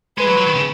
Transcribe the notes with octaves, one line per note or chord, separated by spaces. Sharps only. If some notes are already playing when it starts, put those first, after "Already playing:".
G#3 B4
F#3
F#3
D#3
C#3